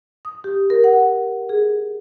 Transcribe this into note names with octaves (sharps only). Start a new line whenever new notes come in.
D#6
G4
A#4
F#5
G#4